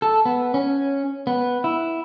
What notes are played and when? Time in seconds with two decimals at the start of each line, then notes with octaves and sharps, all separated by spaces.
0.02 A4
0.25 B3
0.54 C#4
1.27 B3
1.64 E4